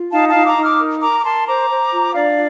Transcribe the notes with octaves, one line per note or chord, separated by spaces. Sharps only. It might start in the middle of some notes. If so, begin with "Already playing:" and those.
Already playing: F4
D#4 F5 A5
F5 A5
D#4
A#5 D6
D#4
D6 F6
A#4
A#4 A#5 D6
D6
A#4 A5 C6
C5 A#5 D6
C5
F4
D4 D5 F5